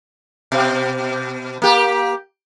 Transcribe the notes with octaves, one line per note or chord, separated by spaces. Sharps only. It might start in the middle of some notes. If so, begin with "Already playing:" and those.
B2
A#3 G4